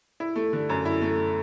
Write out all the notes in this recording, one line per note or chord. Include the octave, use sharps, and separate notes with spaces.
E4
A3
D3
F#2
E4
A3